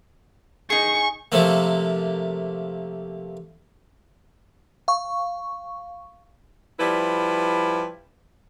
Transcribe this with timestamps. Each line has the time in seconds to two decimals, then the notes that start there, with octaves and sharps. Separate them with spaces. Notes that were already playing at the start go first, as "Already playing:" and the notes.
0.70 D#4 G#4 C#6
1.32 C3 F3 A3 A#3
4.88 F5 C#6
6.79 F3 G3 E4 B4